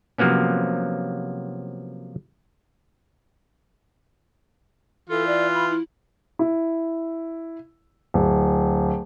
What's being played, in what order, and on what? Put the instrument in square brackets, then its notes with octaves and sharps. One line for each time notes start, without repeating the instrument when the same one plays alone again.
[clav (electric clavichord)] C3 F3 F#3 A#3 B3 C#4
[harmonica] E3 F4 [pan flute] A4
[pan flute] D5
B5
E4
[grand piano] E4
D1